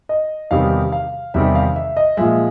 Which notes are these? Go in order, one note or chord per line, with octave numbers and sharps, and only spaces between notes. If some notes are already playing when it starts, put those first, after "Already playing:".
D#5
E2 C3 D#3 G3 F5
F5
E2 C3 D#3 G3 E5
F5
E5
D#5
A#2 F3 G#3 E5